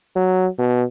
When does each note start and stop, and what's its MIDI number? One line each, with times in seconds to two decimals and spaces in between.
0.16 0.47 54
0.59 0.83 47